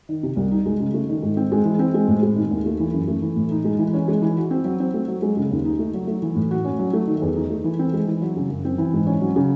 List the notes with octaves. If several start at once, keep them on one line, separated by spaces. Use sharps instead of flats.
D#3
C3
C2
D#4
G#3
C#3
A3
D#3
G#2
C4
G#3
E3
C4
G#3
A2
G#3
D#3
D#2
A3
E3
F#2
A3
E3
A2
D#4
G#3
E3
C#4
G#3
E3
F#4
C4
F#3
C4
A3
F#3
G#3
C#3
D#2
D#4
A3
F#3
A3
E3
A2
F#4
C#4
F#3
A3
D#3
E2
D#4
A3
E3
C4
G#3
E3
F#3
C#3
F#2
C4
E3
G#2
C#4
F#3
C#3